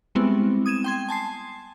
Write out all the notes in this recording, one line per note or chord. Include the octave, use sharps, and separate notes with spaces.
G3 G#3 B3 C4 E4
D#6 G#6 D#7 E7
G5 C6 G#6
G#5 A5 C6 C7